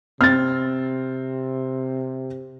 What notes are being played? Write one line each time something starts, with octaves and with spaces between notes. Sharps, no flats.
C3 C4 F6 A6